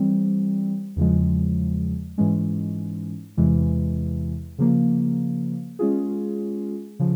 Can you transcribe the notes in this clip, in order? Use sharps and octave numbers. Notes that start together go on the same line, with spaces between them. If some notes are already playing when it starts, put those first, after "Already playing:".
Already playing: E3 G3 C4
E2 C#3 F3 G#3
G#2 E3 G#3 C#4
E2 C3 E3 G#3
C#3 F3 A#3
G#3 C#4 F4 G#4
C#3 F3